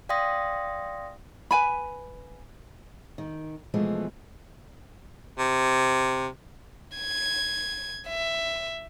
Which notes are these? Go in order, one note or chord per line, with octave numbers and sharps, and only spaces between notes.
D5 F5 G5 C6 D#6 A#6
B4 G#5 B5
D#3
B2 E3 F3 G#3 A3 B3
C3
G#6
E5